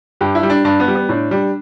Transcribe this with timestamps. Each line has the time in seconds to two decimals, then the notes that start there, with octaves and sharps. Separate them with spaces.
0.21 G2 G4
0.35 E4
0.43 G3
0.50 D4
0.65 G2 D4
0.80 B3
0.88 G3
0.95 B3
1.09 A2 D4
1.31 G3 D4